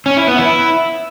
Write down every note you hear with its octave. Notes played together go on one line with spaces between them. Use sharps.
C#4
E4
B3
E4